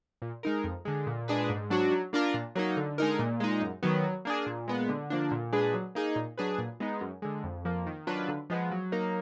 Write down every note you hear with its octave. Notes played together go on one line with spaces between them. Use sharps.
A#2
G#3 D#4 A#4
F2
D3 G#3
A#2
G#3 D4 G#4 B4
G#2
F#3 D4 F#4
F#3
A#3 D4 F4 A#4
A#2
F#3 A#3 D#4
D3
G#3 D#4 A#4
A#2
G#3 D#4
F#2
D#3 F#3 B3
F#3
A#3 D4 G#4
A#2
G#3 B3
D3
F3 A#3 D4
A#2
G#3 D4 G#4 B4
F#3
A#3 D#4 G#4
A#2
F#3 D4 G#4 B4
A#2
G#3 B3 D#4
F#2
D3 G#3
F2
F3 A#3
D#3
F#3 D4 F4 B4
D3
F3 G#3 B3
F#3
A#3 D#4 A#4